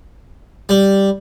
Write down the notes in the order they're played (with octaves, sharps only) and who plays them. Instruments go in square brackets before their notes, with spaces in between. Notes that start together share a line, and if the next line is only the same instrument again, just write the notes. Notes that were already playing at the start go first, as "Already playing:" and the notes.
[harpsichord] G3